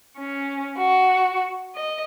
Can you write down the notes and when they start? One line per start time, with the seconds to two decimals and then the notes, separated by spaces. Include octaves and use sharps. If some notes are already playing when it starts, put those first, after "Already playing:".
0.17 C#4
0.77 F#4
1.75 D#5